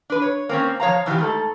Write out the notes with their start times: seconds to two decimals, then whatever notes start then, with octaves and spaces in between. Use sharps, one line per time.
0.10 D4 B4
0.22 C#5
0.49 A#3 C4 C#4
0.80 F3 C#5 F5 A#5
1.06 B2 E3 F#3 F4 G4
1.18 G#2 A3 A4